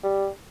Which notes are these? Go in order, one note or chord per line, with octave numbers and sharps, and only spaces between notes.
G3